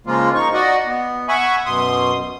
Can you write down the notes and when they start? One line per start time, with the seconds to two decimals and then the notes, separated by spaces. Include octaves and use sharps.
0.07 C#3 F3 G#3 A#3 F4
0.35 D#4 C#6
0.53 F#4 D5 D#5 F#5
0.87 B3
1.29 E5 F#5 G#5 B5 C#6
1.66 F#2 B2 C6 D#6